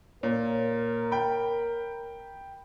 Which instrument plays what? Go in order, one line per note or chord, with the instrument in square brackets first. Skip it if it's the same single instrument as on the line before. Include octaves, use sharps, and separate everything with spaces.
[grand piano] A#2 [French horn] A#4 [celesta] C#5
[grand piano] G5 B5